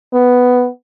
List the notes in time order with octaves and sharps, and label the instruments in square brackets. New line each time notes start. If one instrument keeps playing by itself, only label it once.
[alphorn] B3